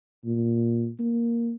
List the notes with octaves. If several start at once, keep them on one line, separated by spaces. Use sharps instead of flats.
A#2
A#3